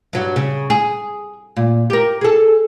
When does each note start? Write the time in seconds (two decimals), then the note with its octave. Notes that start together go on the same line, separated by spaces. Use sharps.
0.13 G2 F#3
0.36 C#3
0.70 G#4
1.56 A#2
1.90 G4 A#4
2.21 G#4 A4